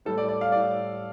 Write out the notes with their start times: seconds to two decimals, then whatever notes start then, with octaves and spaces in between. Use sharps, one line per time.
0.05 A2 G3 A4
0.18 D5
0.29 D5
0.41 F5
0.52 A2 G3 D5